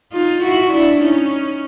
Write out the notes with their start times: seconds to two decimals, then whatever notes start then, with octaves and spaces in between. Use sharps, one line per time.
0.12 D#4 F4
0.43 E4 F#4
0.73 D4 E4
1.03 C#4 D#4